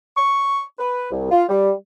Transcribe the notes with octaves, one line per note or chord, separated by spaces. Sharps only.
C#6
B4
C2
F4
G3